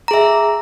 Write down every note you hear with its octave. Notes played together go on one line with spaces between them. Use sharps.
G#4 E5 A#5